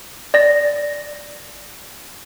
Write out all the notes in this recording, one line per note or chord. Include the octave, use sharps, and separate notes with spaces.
D5 A#6